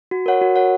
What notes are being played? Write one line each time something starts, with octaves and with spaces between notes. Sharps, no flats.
F#4
A#4 C#5 F#5
F#4
A#4 C#5 F#5